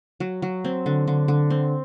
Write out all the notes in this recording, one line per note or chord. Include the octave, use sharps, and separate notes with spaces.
F#3
F#3
C4
D3
D3
D3
C4